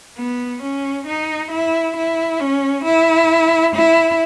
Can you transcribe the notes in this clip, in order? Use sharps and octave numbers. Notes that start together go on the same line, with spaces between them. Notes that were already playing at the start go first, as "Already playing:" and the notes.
B3
C#4
D#4
E4
E4
C#4
E4
E4